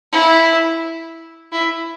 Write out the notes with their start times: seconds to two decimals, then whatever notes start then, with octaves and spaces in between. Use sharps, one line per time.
0.12 E4
1.52 E4